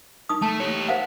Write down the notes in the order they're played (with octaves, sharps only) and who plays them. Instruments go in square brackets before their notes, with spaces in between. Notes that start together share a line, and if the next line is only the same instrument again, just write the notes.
[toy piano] D#4 D#6
[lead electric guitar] A3 [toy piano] A5
[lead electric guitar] G4 C#5
[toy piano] C5 F5 F#5